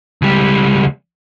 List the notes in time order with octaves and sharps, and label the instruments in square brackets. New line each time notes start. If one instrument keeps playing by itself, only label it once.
[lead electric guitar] C#2 G3